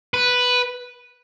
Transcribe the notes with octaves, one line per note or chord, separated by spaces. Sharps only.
B4